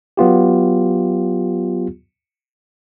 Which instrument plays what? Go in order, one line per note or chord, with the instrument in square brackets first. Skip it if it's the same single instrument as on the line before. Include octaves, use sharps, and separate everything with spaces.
[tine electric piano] F#3 B3 F4 G4